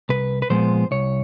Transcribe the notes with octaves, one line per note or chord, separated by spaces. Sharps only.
C2 B4
B4
A#2 F3 G#3 B3 C5
C2 C#5